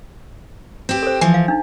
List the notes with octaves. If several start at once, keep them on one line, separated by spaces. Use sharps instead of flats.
C4 G4
A4 C5
E3 F3 G#5
F5
D4 D#4